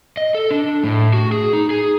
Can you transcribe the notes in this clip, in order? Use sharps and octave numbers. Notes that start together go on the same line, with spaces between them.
D#5
A4
D4
A2
F#4
G#4
D#4
G#4